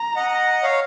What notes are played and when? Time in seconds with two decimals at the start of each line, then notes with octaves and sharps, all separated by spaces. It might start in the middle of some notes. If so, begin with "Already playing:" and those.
Already playing: A#5
0.16 D#5 F#5
0.63 C#5 F5